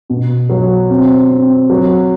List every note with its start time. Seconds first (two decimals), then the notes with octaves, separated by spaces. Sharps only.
0.10 B2
0.49 F#3
0.90 C4
1.30 C4
1.70 F#3